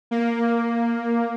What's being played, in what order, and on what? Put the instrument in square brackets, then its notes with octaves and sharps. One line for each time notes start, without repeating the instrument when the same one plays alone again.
[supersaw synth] A#3